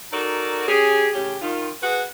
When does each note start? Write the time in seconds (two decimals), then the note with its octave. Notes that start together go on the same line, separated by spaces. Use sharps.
0.12 D#4 F#4 A4 A#4 D5
0.67 C#4 G4 G#4
1.14 A2 C#3 C#4 G4
1.41 D#3 F4
1.82 F#4 G#4 B4